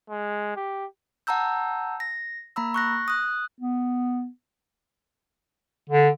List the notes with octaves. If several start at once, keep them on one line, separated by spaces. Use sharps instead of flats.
G#3
G4
F#5 A5 A#5 E6 G6
A#6
A#3 A#5 B5 E6
C#6 F#6 A#6
D#6 F#6
B3
D3